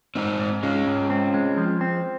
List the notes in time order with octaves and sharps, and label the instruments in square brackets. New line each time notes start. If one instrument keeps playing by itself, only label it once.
[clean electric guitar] G#2 [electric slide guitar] C4 D#4
[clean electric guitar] G#2
[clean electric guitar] G#3 [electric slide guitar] C#4 F4
[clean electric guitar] G#2
C4
G#3
F3
C4